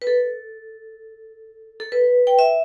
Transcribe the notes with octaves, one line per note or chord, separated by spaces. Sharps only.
B4
A4
A4
B4
G5
E5